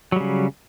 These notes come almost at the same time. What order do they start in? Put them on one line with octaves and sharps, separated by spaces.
F#3 G3 C#3